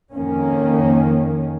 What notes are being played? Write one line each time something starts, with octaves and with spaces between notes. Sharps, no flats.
F2 D#3 A#3 C#4